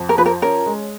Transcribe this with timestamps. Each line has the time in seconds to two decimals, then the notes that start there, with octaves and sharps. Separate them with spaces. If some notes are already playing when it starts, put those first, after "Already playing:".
Already playing: F2
0.09 A#4
0.17 F3 B4
0.26 A#4
0.42 C#4 A#4
0.66 G#3